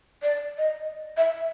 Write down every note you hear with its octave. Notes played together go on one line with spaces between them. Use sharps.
D5
D#5
E5